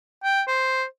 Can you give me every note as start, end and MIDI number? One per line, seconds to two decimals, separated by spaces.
0.24 0.42 79
0.48 0.85 72